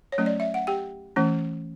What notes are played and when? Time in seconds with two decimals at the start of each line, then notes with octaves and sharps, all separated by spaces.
0.12 C#5
0.18 F#3 A3 C#4
0.26 D5
0.40 E5
0.54 F#5
0.67 G4 G5
1.16 E3 A3 C#4